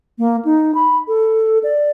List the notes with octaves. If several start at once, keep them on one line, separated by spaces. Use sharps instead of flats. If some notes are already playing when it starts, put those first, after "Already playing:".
A#3
D#4
B5
A4
D5